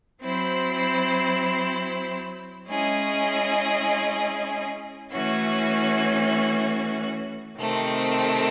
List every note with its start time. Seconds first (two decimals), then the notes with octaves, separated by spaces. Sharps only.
0.22 F#3 C4 E4 C5
2.67 G#3 C#4 E4 G#4 D#5
5.12 E3 A3 C#4 F#4 C#5
7.57 C3 D#3 A3 C4